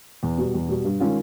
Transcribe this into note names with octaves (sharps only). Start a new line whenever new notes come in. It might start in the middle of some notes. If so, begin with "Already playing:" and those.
E2
B2 G3
E2
B2 G3
G2
D#3 G#3 C#4 F4